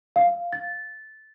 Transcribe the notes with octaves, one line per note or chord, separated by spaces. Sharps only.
F5
A6